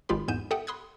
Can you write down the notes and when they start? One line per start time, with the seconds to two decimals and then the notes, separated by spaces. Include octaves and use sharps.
0.09 G#1 G#3 F4 G4 B5
0.28 E2 G#2 B3 G6 D#7 E7
0.51 G4 A4 E5 F#5 G5 D#6
0.67 B5 C6 D#6 F#6 G#6